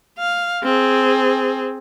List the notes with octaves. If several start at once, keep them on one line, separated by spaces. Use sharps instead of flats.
F5
C4 G#4